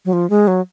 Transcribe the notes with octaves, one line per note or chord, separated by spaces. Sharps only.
F#3
F3
G#3
F#3